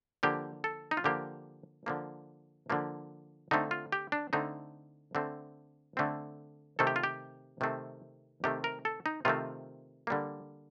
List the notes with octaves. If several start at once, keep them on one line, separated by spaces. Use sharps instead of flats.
D3 F3 A#3 G4
A4
D#4
F4
D3 F3 A#3 G4
D3 F3 A#3
D3 F3 A#3
D3 A3 C4 D#4
F4
G4
D4
D3 A3 C4 D#4
D3 A3 C4
D3 A3 C4
C3 D#3 A3 C4 A4
G4
F4
G4
C3 D#3 A3 C4
C3 D#3 A3 C4 G4
A#4
A4
D#4
C3 D#3 A3 C4 F4
D3 G3 A#3